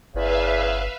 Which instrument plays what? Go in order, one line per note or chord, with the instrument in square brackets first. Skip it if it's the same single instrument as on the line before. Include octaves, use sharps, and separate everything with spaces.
[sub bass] G1 [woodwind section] E2 C#3 [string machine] B4 E5 F5